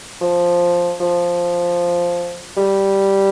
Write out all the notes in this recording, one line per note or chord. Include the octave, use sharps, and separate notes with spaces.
F3
F3
G3